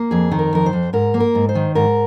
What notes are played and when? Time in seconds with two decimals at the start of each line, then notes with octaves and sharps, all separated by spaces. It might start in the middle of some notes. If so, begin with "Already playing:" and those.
Already playing: A#3
0.11 F2 G#4
0.31 D#3
0.39 A#4
0.53 F2 A#4
0.66 C5
0.73 F2
0.93 G#2 A#4
1.14 A#3
1.20 A#4
1.35 G#2
1.49 C5
1.55 D#3
1.75 G#2 A#4